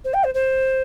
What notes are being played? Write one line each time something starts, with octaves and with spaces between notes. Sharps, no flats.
C5
G5
C5
C5